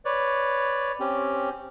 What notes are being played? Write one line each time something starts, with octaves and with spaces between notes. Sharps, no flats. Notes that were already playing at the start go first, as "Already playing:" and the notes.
B4 C#5 D5
C4 C#4 G4